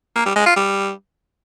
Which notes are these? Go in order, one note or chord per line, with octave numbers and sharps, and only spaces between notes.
A#3
G3
G#3
F4
G3